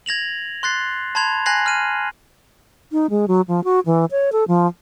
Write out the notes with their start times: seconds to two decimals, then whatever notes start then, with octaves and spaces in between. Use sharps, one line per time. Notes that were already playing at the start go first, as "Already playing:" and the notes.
0.06 G#6 A#6 F7 F#7
0.63 C6 F#6 A6 C7
1.15 A5 B5 C6 G#6 F7
1.46 G#5 F#6 G#6 A#6 C7 F#7
1.66 F6 D#7
2.91 D#4
3.10 G#3
3.28 F#3
3.48 F3
3.64 F#4
3.86 E3
4.11 C#5
4.32 A4
4.48 F3